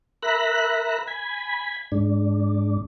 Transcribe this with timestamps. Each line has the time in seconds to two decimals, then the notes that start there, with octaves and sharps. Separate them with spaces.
0.23 A#4 E5 A#5 B5 F#6
1.07 G#5 B5
1.92 G#2 D4